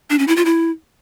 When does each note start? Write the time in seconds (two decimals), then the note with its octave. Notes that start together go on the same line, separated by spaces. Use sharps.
0.10 D4
0.19 C#4
0.28 E4
0.36 F4
0.45 E4